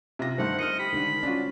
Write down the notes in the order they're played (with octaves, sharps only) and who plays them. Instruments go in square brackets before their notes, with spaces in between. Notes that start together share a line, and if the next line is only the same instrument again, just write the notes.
[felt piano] C3 F4 A#6
[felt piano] G2 D#3 A3 [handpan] G3 C5 [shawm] F#5
[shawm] D#5 [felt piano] F6 C#7
[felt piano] G4 [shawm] B5
[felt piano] D3 D#3 [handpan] G#3 D4
[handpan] C#4 [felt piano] D4 F4 F#4